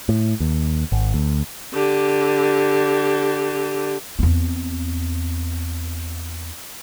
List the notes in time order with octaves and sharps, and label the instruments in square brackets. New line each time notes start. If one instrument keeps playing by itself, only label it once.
[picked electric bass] A2
D#2
G#1
D2
[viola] D3 G4
[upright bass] E2 C4